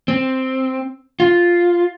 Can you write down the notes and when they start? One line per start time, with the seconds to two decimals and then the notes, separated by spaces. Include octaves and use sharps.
0.08 C4
1.20 F4